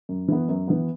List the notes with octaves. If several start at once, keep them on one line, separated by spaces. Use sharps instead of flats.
F#2
E3 B3
F#2
E3 B3